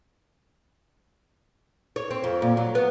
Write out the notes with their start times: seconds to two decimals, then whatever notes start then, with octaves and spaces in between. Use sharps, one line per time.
1.96 C#5
2.11 C4
2.24 F2
2.42 A#2
2.57 F#3
2.75 B3